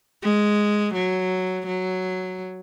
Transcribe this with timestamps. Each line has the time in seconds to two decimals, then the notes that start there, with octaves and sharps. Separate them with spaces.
0.23 G#3
0.95 F#3
1.67 F#3